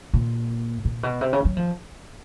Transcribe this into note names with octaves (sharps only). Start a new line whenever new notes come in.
A#2
A#2
B2
C3
C#3
F#3
F3